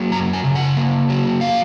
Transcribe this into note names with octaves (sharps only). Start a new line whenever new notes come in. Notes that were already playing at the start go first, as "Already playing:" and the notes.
Already playing: F#3 A#3
F#2 A#5
G#5
C#3
F#5
A#3
F#3
F5